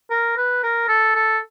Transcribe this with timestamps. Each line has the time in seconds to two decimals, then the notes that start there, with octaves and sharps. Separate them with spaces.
0.10 A#4
0.37 B4
0.63 A#4
0.89 A4
1.15 A4